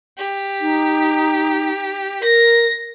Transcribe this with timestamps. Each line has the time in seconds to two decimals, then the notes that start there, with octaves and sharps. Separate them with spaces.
0.17 G4
0.61 D#4
2.21 A#4 A#6